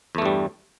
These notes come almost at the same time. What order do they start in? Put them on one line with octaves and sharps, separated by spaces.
E2 A3 G2 G3